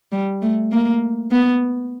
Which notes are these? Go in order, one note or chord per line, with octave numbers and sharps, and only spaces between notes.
G3
A3
A#3
B3